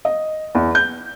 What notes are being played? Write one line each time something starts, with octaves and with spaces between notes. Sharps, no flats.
D#5
E2
G6